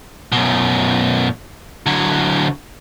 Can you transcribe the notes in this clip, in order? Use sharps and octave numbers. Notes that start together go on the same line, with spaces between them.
F#2 B2
D3 F#3